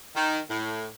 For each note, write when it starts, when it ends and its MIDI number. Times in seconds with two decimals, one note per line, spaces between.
0.16 0.39 51
0.50 0.87 45